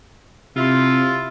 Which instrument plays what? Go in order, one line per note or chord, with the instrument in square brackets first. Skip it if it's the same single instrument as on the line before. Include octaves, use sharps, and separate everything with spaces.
[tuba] C3 [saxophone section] E4 F4